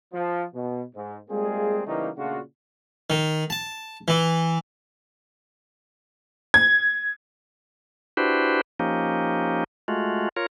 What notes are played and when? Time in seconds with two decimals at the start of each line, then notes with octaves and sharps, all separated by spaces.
0.13 F3
0.54 B2
0.95 G#2
1.29 G3 G#3 A#3 C4 F4 G#4
1.87 C#3 E3 G3 A3 A#3 D#4
2.17 A#2 C#3 A3 D4 F4 F#4
3.10 D#3
3.50 A5
4.08 E3
6.54 G#6
8.17 D4 E4 F#4 G4 B4 C5
8.80 F3 A#3 C#4 D#4 G4
9.88 G#3 A3 F4 F#4
10.36 F4 A#4 C#5